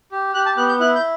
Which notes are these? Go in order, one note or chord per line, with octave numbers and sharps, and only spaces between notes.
G4
G4 F#6
A5
B3 F#6
G6
E4 F#6
G6